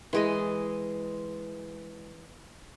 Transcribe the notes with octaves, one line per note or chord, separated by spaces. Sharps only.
E3 G#3 D#5